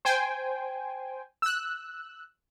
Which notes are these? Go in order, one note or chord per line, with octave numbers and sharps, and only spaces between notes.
C5 G5 G#5
E6 F#6